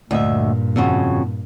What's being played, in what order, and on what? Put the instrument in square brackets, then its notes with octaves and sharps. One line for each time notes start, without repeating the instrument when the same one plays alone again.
[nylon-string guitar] D2 D#5 E5 [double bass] G2 A#2
[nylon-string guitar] F2 C#3 F#4